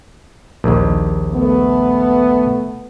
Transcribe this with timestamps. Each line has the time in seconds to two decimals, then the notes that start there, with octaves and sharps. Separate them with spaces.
0.64 A#1 D#2
1.35 A3 B3